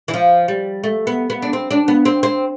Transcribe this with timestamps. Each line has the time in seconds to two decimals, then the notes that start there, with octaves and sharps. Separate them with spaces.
0.08 E3
0.14 F3
0.48 G3
0.84 A3
1.07 B3
1.30 B3
1.42 D4
1.53 C4
1.71 D4
1.88 B3
2.05 C4
2.23 C4